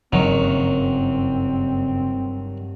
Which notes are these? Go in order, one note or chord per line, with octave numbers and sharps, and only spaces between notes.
F#1 G2 D#3 F#3 C4